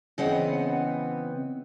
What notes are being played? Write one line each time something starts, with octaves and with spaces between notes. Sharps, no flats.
C#3 E3 B3 C4 D#5 F#5